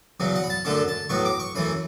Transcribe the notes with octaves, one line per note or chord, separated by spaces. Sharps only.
E2 C#3 F#3 C#4
F#5
B5
A5
F#2 D3 A3 C#4 A5
A5
A2 F#3 B3 C#6
D6
C#6
F#2 E3 A3 B5